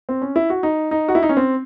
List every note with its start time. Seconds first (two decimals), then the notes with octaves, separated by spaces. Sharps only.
0.09 C4
0.22 C#4
0.36 E4
0.50 F#4
0.63 D#4
0.91 D#4
1.08 F#4
1.15 E4
1.23 D#4
1.29 C#4
1.37 C4